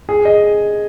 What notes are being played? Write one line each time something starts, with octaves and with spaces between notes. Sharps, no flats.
G#4
D#5